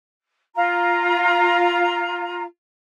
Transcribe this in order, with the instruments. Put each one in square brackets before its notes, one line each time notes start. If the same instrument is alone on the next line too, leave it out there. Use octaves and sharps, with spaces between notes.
[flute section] F4 A#5